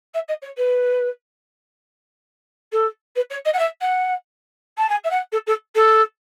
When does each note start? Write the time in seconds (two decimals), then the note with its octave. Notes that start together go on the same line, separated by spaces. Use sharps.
0.14 E5
0.28 D#5
0.42 C#5
0.57 B4
2.72 A4
3.16 B4
3.30 C#5
3.45 D#5
3.53 F#5
3.59 E5
3.81 F#5
4.78 A5
4.89 G#5
5.04 E5
5.10 F#5
5.32 A4
5.46 A4
5.75 A4